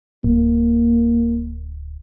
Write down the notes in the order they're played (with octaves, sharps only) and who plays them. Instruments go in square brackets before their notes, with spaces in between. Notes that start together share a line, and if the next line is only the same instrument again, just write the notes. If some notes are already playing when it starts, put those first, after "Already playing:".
[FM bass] D1 [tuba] A#3